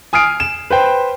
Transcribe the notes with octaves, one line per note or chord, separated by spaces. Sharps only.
G#5 D#6 F6 C7 D7
E7
B4 C5 G5